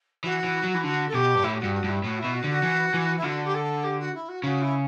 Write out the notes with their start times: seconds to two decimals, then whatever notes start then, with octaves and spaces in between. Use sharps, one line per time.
0.24 E3 F#4
0.44 E3
0.64 F#3
0.74 E3
0.84 D3 F#4
1.08 A4
1.14 B2 G4
1.35 G2
1.43 A2 E4
1.54 G4
1.59 G2 F#4
1.74 F#4
1.84 G2 E4
2.04 A2 F#4
2.19 E4
2.24 B2
2.34 F#4
2.44 D3 F#4
2.63 E3
2.94 E3
3.17 E4
3.23 D3 F#4
3.44 G4
3.54 A4
3.84 G4
3.99 F#4
4.14 E4
4.28 F#4
4.44 C#3 F#4
4.61 E4